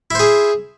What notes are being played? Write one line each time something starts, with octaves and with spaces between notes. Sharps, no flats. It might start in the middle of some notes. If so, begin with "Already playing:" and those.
E4 G#4 C5